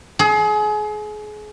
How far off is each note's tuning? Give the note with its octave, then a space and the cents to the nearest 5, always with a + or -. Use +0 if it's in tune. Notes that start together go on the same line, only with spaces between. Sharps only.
G#4 +30